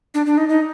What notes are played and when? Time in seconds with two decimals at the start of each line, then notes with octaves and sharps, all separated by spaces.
0.14 D4
0.26 D4
0.38 D#4
0.49 D#4